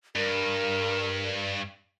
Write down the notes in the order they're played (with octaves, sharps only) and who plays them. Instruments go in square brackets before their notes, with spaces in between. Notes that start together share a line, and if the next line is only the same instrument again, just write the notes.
[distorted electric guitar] G2 [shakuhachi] A#4